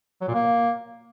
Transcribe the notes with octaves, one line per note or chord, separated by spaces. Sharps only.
F#3
A#2
A#3